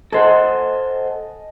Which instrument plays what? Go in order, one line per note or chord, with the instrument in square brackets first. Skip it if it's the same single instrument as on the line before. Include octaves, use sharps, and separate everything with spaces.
[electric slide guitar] A4 C5 F#5 [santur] D#5 G#5 A5